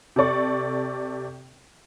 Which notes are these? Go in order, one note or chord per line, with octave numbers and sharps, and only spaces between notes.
C3 A4 D5 C#6